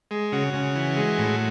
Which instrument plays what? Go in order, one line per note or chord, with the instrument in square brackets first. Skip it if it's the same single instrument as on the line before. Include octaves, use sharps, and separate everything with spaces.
[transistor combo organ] G#3
C#3 F#4
C#3
E3
G#3
A2